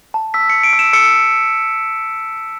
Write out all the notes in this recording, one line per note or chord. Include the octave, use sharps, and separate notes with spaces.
A5
E6 B6
E6 C#7
D7
E6
E7
E6 C#7
E6